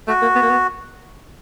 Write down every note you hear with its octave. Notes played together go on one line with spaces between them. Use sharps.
A3 F#4
A#3
B3
A#3
B3